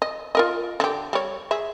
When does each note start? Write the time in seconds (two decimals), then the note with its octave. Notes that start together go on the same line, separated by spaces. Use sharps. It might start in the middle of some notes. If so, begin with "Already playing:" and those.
0.02 D#5
0.35 F4 A#4 D#5
0.80 D3 G4
1.13 G3 C#5
1.51 G#4 E5